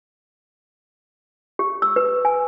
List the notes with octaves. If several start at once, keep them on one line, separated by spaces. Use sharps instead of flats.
G4
E6
B4
G#5